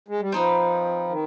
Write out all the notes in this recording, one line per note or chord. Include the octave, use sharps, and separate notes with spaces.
G#3
G3
F3 C4 D#4 B4
D#3